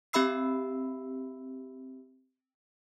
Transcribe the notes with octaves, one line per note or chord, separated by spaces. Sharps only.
C4 G4 E5 B5 E6 C7